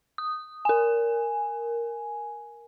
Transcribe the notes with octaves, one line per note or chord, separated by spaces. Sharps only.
D#6
A#4 G#5